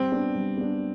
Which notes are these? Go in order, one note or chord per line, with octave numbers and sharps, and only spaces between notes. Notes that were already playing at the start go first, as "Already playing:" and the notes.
Already playing: G3 C4
B3 D4
G3
B3 D4